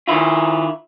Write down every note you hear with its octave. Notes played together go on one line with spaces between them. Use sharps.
D#3 E4 F4